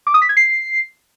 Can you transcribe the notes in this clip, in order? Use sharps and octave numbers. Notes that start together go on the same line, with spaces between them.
D6
D#6
B6
G#6
C7